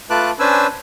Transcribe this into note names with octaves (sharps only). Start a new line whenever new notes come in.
A3 F4 B4 A5 D6 F#6
C#4 D4 B4 C5 G#5 E6